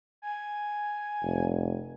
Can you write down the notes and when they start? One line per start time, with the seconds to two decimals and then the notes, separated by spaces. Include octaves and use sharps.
0.22 G#5
1.22 F1